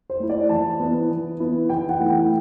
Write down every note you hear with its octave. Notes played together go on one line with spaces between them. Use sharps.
C5
A3 E4
D5
E3 A5
B3 E4
E3
B3 E4
E3 G5
F#5
A3 E4
G5